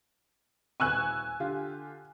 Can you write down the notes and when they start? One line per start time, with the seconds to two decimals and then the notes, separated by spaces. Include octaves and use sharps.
0.80 D#1 B4 G#5 C#6 E6 F#6
1.40 D3 F4 G4